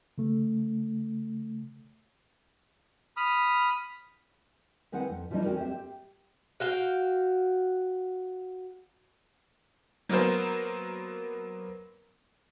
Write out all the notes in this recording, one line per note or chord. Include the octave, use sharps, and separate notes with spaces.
C#3 A3
B5 D#6 F6
D#3 G#3 C4 E4 B4 F#5
F2
E3 F3 G3 C#4 D#4 E4
D2 C4 C#4 F#4 A#4 D5
C4 G4 E5
G4
F#4 F5 G5
F#3 A#3 B3 A#4 C5